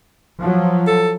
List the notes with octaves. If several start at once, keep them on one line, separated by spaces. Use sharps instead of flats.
F3 F#3
A4